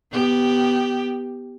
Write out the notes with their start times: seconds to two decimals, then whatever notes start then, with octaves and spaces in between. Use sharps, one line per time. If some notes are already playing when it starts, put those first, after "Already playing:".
0.11 B3 G4